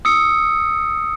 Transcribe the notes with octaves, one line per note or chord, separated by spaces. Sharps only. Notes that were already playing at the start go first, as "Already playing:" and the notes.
D#6 E6 C#7